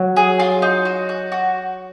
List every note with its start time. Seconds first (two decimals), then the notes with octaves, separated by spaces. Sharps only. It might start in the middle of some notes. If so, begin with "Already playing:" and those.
Already playing: F#3
0.16 G#4
0.39 F4
0.62 D#4
0.85 F#4
1.09 F#4
1.32 F#4